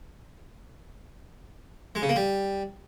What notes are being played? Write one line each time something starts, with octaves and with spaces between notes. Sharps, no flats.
G#3
C#3
A#3
G3